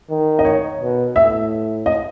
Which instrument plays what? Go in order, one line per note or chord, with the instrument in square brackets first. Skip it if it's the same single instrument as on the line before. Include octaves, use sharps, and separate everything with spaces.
[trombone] D#3
[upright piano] D#5
C#5
[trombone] B2
[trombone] A2 [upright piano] E5
[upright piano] D#5